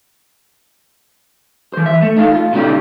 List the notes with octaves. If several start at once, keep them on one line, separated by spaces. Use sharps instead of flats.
E3 C5
E5
A3
D#4 A4 F5
F4
B2 D3 C#4 D#4 G4